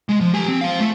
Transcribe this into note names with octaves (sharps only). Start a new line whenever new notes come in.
G#3
F3
G4 G#5
C4
C5 F5
A3